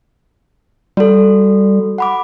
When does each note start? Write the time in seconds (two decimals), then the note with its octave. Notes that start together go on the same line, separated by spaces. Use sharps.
0.97 G3 F#4 A4
1.98 F#5 B5 D6